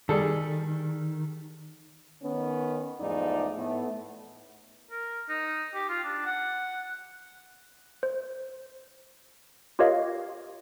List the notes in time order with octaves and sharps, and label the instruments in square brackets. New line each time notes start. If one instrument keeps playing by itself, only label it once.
[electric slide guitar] D#3 [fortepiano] G3 G#4 A4
[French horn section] D#3 B3 C#4
E2 G#2 F3 A3 D#4 D5
A2 A3 B3
[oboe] A#4
D#4
G4
F4
D4
F#5
[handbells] C5
F4 G4 A#4 C#5 D#5 F5